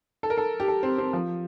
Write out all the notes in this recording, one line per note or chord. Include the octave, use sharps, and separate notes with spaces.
A4
A#4
A4
G4
A4
C4
C4
F3